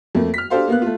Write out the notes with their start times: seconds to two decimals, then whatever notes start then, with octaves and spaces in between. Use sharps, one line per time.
0.15 F2 A3 A#3
0.34 F6 B6
0.50 D4 G4 A4 C5 F5
0.68 A#3 B3 F5 F#6
0.82 A3 F4